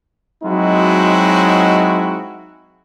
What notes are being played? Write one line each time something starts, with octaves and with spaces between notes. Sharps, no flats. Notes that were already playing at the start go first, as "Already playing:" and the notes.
F#3 G#3 C4 D#4 E4 F#4